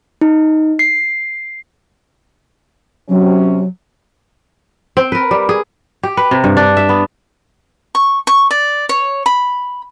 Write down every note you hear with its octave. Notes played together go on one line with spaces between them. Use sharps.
D#4
C7
C3 F#3 C#4
C4
A#4 B4
G3
G#4
G4
B4
C3
G2
D4
E5
B3
C#6
C#6
D5
C#5
B5